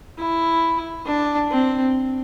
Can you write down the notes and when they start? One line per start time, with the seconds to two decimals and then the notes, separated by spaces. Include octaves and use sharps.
0.18 E4
1.06 D4
1.51 C4